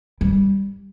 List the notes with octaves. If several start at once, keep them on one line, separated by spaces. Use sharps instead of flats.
G3